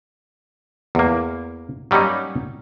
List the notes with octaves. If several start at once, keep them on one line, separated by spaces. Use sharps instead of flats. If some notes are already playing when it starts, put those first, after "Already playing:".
E2 A#3
F#3 G3 A#3 C#4 D#4